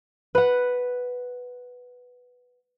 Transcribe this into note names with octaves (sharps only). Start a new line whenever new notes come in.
B4 F#5